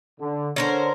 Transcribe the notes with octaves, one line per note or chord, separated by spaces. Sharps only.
D3
D3 C#4 A#4 C5